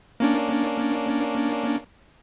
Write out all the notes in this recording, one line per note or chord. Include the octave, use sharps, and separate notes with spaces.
A#3 C#4 D4